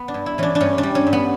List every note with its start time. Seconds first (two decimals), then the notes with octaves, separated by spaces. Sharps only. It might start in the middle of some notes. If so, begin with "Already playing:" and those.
Already playing: B3
0.08 D4
0.14 G2
0.26 E4
0.38 E3 C#4 D4
0.55 D4
0.60 G2 C#4
0.78 D4
0.83 G3
0.95 C#4
1.07 G2
1.13 B3